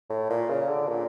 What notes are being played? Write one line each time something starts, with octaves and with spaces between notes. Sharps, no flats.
A2
A#2
C#3
D3
A#2